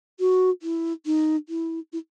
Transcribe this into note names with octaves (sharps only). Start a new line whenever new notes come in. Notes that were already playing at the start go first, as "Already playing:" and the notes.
F#4
E4
D#4
E4
E4